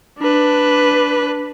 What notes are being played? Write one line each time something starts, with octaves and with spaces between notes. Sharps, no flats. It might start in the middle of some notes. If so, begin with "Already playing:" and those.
D4 B4